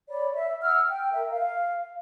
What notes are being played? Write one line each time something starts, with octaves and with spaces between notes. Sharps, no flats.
C#5 D5 B5
E5
F#5 E6 F6
G5
A#4 E5
F5